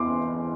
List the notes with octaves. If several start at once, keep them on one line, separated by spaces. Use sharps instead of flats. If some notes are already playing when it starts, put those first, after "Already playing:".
Already playing: E2 C6 D6